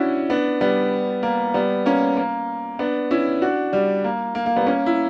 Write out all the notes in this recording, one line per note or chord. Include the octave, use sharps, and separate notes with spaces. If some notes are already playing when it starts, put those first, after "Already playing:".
Already playing: C#4 D4 E4 F#4
B3 D4
G3 B3
A#3
G3 B3
A#3 C#4
A#3
B3 D4
C#4 E4
D4 F#4
G3
A#3
A#3
A#3
G3 B3
A#3 C#4
E4